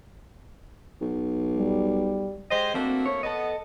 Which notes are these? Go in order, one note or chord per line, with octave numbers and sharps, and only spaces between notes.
B1
G3
G#3 G4 C5 D#5
A3 A#3 C4 D4 F#4
C#5
B3 A4 D#5